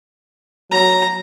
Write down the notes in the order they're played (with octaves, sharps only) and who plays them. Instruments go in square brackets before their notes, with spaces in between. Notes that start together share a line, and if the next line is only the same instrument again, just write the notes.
[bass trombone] F#3 [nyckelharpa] A#5